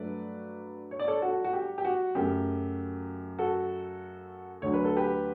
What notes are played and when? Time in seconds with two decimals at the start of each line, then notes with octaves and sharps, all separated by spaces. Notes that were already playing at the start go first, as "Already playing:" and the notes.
Already playing: G2 F#3 A3 B4 D5
0.91 C#5
0.99 D5
1.08 A4 C#5
1.22 F#4 A4
1.44 F#4
1.53 G4
1.78 G4
1.85 F#4
2.15 F#2 C#3 F#3 A3 G4
3.39 F#4 A4
4.62 D2 D3 F#3 C#5
4.74 B4
4.85 A4
4.97 G4 B4